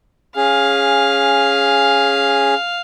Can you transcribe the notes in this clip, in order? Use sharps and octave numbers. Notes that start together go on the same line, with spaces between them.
C#4 G#4 F5